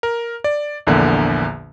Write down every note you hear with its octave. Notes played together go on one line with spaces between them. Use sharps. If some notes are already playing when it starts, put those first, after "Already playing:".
A#4
D5
A#1 E2 D3 A#3